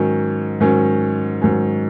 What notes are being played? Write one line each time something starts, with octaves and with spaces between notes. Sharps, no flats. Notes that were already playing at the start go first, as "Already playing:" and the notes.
Already playing: G#2 D#3 F#3 C#4
G#2 D#3 F#3 C#4
G#2 D#3 F#3 C#4